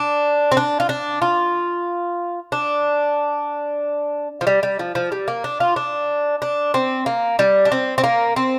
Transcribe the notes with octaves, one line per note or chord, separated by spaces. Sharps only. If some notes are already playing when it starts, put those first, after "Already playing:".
Already playing: D4
C4
D4
F4
D4
F4
D4
F3
G3
G3
F3
F3
G3
A#3
D4
F4
D4
D4
C4
A#3
G3
D4
C4
C4
A#3
C4